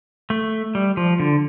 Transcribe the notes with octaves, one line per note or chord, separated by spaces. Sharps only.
A3
G3
F3
D3